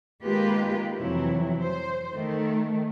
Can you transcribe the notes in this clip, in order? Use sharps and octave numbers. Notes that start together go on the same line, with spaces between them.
D#3 G#3 A#3 F4 G4 B4
F2 C3 E3 F#3 E4
C5
D#3 A3